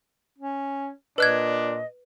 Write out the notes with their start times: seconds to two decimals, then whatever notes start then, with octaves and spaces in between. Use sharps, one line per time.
0.39 C#4
1.18 A#2 D4 B4 D#5 F#6 G#6